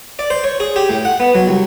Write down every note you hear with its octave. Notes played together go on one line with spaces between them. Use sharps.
D5
C5
C#5
G#4
G4
A2
F#5
B3
F#3
C2